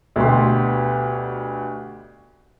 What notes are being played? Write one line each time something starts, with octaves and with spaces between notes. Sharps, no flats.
D2 B2 B3 G4 C6